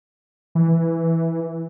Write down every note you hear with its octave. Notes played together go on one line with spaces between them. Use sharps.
E3